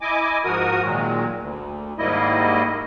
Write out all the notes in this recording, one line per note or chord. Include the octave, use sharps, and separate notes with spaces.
E4 D#5 G#5 D6
G#2 F3 F#4 A#4 D#6
A#2 D#3 F#3 G#3
D2
G#2 D#3 G3 A#3 E4 D#5